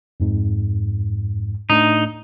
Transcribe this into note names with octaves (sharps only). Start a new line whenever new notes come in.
F2 G#2
A2 A3 D4 D#4